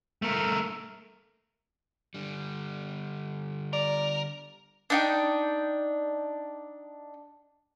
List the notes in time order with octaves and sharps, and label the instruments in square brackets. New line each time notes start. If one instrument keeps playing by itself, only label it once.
[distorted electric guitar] A3 A#4
[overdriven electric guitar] D3 G3
[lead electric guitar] A#4 [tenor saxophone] D5
[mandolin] D4 D#4 G5